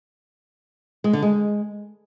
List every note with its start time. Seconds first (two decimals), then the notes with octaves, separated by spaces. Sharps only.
1.04 G#3
1.13 D3
1.22 G#3